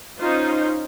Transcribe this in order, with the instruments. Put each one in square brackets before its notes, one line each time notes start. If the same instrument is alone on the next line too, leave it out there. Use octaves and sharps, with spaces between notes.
[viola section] C#4 D#4 F4 C5